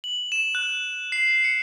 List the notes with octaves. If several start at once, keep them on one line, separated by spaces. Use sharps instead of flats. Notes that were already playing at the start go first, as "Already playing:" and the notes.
F#7
E7
F#6
C7
C#7